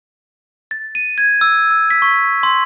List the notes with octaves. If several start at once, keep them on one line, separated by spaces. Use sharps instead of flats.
A6
D#7
G#6
E6
E6
B6
C#6
C6